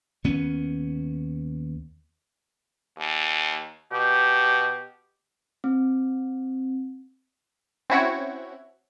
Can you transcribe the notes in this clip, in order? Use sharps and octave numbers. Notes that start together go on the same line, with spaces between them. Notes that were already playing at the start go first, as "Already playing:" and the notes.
D#2 B3 C#4
D#2
B2 G4
C4
C4 C#4 E4 F#4 C#5